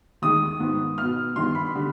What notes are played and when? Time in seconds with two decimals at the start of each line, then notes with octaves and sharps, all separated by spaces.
0.22 D#2 D#3 G#3 D#6
0.60 G#2 D#3 B3
0.98 B2 B3 F6
1.36 G2 D#3 B3 C6
1.55 B5
1.75 D3 G3